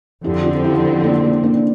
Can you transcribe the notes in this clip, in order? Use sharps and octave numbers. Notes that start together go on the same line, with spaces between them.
F2 D3 F3 C4 E4 G4
D4 F4
E4 G4
A#3 D4
A#3
A#3 D4
D4